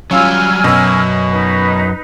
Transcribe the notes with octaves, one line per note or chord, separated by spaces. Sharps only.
F#3 G3 C#4 F4 G#5 E6 F6
F#2 B2 C#4
D#4 B4